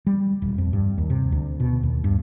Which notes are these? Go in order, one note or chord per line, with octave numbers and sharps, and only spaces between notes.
G3
D#1
F2
G2
D#2
C3
D2
B2
D#2
G2